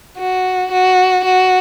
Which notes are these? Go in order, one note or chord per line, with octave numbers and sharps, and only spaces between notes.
F#4
F#4
F#4